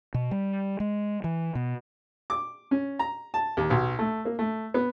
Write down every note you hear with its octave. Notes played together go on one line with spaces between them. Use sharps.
B2
G3
G#3
E3
B2
D6
C#4
A#5
A5
D#2
B1
A3
A#3
A3
B3